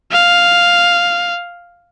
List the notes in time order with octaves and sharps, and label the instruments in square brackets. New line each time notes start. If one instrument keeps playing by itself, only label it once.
[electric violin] F5